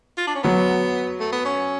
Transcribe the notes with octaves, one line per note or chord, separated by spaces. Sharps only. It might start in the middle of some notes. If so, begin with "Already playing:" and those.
F4
D4
C#4
F#3 B3
A3
B3
C#4